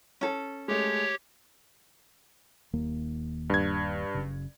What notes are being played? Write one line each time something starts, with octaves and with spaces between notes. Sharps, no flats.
C#4 A4
G#3 A3 G4 C#5
D#1 D#2 A#3
G2 G#6
F#1 C#3